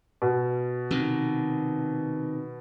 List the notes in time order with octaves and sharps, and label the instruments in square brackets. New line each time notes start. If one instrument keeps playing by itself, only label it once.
[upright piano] B2
[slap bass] C3 D#3